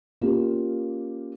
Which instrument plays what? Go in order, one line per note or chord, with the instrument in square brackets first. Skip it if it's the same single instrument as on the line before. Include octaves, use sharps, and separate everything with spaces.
[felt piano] A#3 C#4 F4 G4